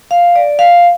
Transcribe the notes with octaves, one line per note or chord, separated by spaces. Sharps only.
F5
D5
F5